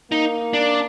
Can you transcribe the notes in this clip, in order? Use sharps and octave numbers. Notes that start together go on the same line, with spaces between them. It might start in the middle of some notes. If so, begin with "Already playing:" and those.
A#3 D#4
D4